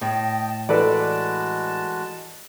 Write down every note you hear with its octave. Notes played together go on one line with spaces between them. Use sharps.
A2 D#5 G5 A5
E3 G#3 F#4 A4 B4 D5 A5